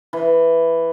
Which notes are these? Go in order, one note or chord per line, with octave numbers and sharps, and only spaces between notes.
E3